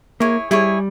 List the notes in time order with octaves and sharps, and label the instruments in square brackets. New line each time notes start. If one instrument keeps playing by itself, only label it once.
[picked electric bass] A#3 [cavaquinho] E4 G#4 C#5
[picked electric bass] G3 [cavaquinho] E4 G#4 C#5